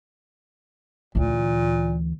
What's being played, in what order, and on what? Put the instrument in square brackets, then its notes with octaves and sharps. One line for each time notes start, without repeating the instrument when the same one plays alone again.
[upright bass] D2 E3 [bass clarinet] A#2